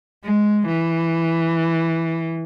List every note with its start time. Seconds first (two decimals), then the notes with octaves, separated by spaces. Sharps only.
0.24 G#3
0.67 E3